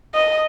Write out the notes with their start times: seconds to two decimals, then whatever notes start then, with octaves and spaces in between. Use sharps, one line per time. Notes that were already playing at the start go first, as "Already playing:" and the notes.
0.14 D#5